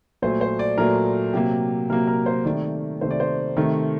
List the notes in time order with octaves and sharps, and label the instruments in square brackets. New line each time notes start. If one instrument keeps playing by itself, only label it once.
[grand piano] A#2 F#3 A3 C5
C5
D5
A#2 F#3 A3 A#4
C3 F#3 A#3 G4
C3 F#3 A#3 A#4
A#4
C5
C3 D#3 A3 D5
C3 D#3 A3 C5
D5
C5
C3 D#3 A3